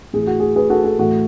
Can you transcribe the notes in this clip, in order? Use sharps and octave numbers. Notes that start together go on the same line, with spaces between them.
A2 E3 G#4
F#4
G#4
G#4 B4
F#4 A4
F#4 A4
A2 E3 F#4 A4